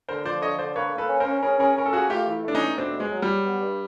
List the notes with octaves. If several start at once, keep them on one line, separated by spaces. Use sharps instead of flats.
D3 A#4 C5
F3 C5 D5
D3 C#5 D#5
D3 C5 D5
A#3 B4 C#5
A#3
A4 B4
C#4
A#4 C5
C#4
C#4 G#4 A#4
C#4 G#4 A#4
C#4 A#4
A4
A#3 F#4 G#4
A3 F4 G4
E3
A3 D4
C#4 D#4
A3
B2 C4 D4
E2
G#3
F#3
G3
F#3
B3
G2